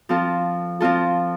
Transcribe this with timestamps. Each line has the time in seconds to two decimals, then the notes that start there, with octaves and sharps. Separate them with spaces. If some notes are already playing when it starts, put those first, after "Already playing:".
0.09 F3 C4 F4 A4
0.80 F3 C4 F4 A4